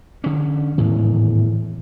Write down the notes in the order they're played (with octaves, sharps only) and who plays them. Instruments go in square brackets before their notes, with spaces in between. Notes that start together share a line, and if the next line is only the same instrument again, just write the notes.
[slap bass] D3 C#4
[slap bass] G#1 E2 [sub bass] A2